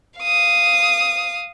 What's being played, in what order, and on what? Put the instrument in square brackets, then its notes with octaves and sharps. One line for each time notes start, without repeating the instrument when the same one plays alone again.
[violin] F5 D#6